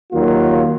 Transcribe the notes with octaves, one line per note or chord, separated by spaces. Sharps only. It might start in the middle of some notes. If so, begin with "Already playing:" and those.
D#2 D#3 F#3 A#3 F4